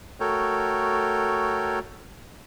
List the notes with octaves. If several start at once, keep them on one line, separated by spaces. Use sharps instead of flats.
A3 F#4 A4 A#4 C#5 G5